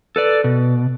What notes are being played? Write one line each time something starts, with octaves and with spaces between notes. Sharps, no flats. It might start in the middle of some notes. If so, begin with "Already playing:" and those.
A4 B4 D5
B2